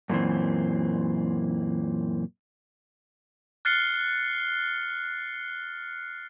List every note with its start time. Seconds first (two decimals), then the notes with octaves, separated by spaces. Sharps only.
0.10 F#2 A#2 E3 C4
3.65 F6 F#6 A6 C7 C#7 G7